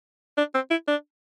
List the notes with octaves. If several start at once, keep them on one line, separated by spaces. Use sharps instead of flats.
D4
C4
E4
D4